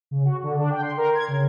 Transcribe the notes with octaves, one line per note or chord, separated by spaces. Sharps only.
C#3
F#4
D3
D4
G5
C6
A#4
G#6
C#3